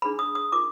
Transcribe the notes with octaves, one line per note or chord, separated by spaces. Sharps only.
D4 G#4 B4 B5
D#6
D#6
F4 A#4 D6